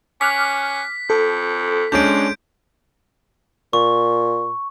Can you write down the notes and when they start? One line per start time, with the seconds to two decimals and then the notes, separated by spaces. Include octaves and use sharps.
0.21 C#4 D6 F6 F#6 B6
1.10 F2 A4
1.92 F2 G#3 C#4 D4 G6 D7
3.73 A#2 C#6